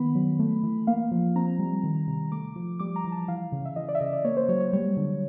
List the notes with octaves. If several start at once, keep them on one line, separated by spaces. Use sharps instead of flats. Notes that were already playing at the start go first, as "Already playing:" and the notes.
Already playing: D#3 B3 B5
F#3
A3
E3
A#3 F5
F3
C4 A#5
G3
D#3
C3
A3 D6
F3
G3 D6
A#5
E3
A5
E3 F5
C#3
E5
E3 D#5
D5
E5
C#3 D#5
D5
A#3 C#5
C5
F#3 C#5
C#5
G3 C#5
D3